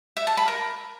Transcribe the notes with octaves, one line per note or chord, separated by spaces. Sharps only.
E5
A5
B5
A#4